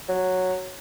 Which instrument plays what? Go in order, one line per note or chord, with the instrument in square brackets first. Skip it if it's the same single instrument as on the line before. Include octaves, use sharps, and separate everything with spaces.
[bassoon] F#3